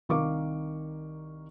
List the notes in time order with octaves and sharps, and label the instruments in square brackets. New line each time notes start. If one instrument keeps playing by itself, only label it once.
[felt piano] C2 D#3 A#4 F5 C#6 D6